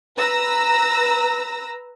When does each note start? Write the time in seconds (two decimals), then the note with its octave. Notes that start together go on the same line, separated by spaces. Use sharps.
0.18 B4 A#5 E6 A#6